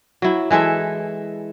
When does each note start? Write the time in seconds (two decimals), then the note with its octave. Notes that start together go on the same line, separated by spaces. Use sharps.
0.22 F#3 E4
0.51 E3 G#3 A4 E5